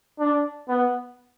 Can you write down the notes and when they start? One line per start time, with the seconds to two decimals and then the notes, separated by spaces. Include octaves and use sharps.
0.20 D4
0.69 B3